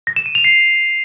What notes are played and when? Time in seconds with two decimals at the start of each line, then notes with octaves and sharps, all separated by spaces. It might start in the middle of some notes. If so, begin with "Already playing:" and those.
0.07 A#6
0.16 E7
0.26 D#7
0.35 F7
0.44 C7